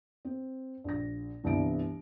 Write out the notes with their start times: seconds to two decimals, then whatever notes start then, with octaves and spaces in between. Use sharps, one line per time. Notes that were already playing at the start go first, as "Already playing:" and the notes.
0.25 C4
0.84 A#1 A#6
1.44 G1 C2 E3 B3 D7